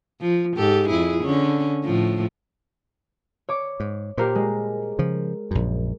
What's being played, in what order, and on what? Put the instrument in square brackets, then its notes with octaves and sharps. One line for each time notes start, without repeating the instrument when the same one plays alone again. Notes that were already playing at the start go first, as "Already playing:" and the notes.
[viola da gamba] F3
G#2 G4 A4
F2 E4 G#4
D3 C#4
A2 F3
[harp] C#5 D6
[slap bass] G#2
[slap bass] A#2 [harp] G4 A#4 C5
[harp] G#3
[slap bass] C#3 F3
A#1 F#2